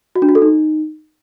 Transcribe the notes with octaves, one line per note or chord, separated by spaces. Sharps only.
F#4
D4
F#4
A4
D#4